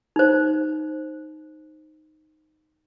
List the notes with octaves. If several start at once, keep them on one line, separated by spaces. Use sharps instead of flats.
D#4 C5